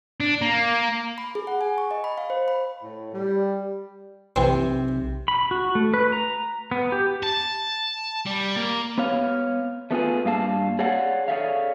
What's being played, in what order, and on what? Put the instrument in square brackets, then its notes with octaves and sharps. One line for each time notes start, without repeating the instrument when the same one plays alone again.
[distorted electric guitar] D4
A#3
[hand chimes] B5
G#4
F#5
G#5
C#6
D#5
B5
F5
C5
B5
[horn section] A2
G3
[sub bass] B1 [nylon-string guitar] C3 [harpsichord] E3 C4
[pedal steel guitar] B5
F#4
A3
B4
A#5
B3
G4
[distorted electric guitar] A5
G3
A#3
[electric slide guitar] B3 C#5 F5
A3 B3 F4 G#4
G2 A#3 F5 A5
G#4 C#5 D5 F5 F#5
G#4 A4 C#5 D5 E5 F5